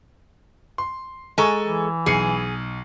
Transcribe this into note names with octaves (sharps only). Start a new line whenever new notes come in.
C6
G#3 A4 G#5 A#5 C#6
E3
B1 G#4 C7 C#7